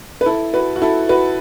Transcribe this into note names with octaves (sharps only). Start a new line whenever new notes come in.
B4
E4 A4
F#4 B4
F#4
E4 A4
F#4 B4